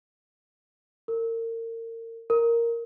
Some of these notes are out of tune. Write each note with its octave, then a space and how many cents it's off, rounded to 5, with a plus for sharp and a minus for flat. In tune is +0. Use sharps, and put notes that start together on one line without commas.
A#4 -35
A#4 -5